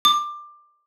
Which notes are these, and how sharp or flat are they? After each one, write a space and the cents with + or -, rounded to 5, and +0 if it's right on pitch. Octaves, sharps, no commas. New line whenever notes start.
D6 +20